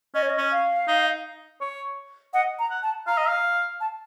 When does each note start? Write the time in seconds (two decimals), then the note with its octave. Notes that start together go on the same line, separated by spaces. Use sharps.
0.15 C#4 D#5
0.22 C#5
0.30 D#5
0.38 C#4
0.52 F5
0.88 D#4
1.61 C#5
2.34 D#5 F#5
2.59 A#5
2.71 F#5
2.83 A5
3.07 F5 A#5
3.18 D#5
3.28 F5
3.80 A5